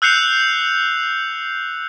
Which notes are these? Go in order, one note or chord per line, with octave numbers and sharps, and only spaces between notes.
E6 F#6 G6 C7 C#7 F7